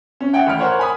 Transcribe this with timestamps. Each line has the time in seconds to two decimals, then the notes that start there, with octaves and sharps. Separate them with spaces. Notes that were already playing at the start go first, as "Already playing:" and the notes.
0.21 C#4
0.33 E5 F#5 G5
0.47 A1 B5 F6
0.59 A#4 C5 C#5 F#5
0.79 G#5 B5 D#6